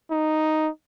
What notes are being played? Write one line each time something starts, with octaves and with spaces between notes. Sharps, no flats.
D#4